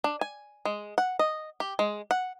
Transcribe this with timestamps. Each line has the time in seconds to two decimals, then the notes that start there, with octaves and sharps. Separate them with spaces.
0.04 D4
0.21 G#5
0.65 G#3
0.98 F#5
1.19 D#5
1.60 G4
1.79 G#3
2.11 F#5